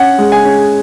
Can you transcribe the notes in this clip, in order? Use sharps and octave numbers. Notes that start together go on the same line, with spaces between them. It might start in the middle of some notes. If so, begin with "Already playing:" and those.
Already playing: C#4 F#5
G#3
G#5
C#4